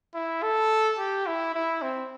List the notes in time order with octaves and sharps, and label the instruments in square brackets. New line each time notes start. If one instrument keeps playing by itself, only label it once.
[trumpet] E4
A4
G4
E4
E4
C4